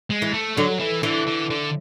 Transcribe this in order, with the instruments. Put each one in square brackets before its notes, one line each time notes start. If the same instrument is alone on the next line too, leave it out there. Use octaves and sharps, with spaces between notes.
[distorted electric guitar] G#3
[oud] E3
[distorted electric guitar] A3
[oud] D3 [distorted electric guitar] F#3
[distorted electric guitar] E3
[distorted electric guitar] D3 [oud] E3
[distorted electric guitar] D3
D3